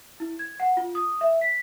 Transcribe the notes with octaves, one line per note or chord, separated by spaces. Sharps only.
E4
G#6
F#5
F4
D#6
E5
B6